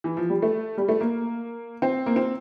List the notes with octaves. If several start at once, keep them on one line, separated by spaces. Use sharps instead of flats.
E3
F3
G3
A3
G3
A3
A#3
C4
A#3
C4